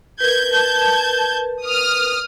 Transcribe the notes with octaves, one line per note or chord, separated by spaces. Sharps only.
A#4 B4 G6 G#6
A5 G6 G#6
D#6 F6